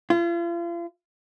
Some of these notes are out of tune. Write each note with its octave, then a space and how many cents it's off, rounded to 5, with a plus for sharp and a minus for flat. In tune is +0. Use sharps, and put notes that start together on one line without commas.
F4 -40